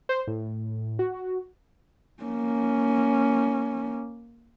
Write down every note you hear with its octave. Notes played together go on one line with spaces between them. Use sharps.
C5
A2
F#4
A#3 C#4